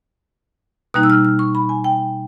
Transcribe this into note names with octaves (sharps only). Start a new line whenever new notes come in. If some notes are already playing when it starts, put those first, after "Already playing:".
B2 G3 A#3 D#4 F#6
E6
F6
F6
C#6
B5
G#5
G5